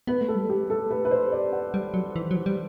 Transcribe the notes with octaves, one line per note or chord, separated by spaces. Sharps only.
B3 B4
A3
A4
G3
A3 G4
A4
B4
B4
C5
D5
F#5
G3
F#3
E3
F#3
E3
G3